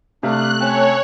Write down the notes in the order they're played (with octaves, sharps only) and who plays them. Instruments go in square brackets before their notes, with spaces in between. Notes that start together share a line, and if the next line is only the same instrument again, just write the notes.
[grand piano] C3 [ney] A3 [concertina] D4 F5 [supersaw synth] F#6
[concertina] C4 C#4 A5 [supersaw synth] C#5